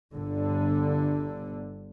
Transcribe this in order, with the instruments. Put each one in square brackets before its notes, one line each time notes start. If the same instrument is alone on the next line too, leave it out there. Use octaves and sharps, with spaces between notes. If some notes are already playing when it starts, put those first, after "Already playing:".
[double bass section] G1 D3